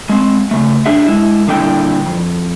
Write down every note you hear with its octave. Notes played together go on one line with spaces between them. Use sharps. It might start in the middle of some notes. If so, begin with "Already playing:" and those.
G#3 C4
C#3 A3
D4 G#4 E5
G#3 E4
A#2 D3 G3 E4 G5
F2